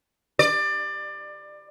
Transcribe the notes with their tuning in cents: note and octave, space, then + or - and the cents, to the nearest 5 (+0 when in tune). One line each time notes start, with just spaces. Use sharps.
D5 +25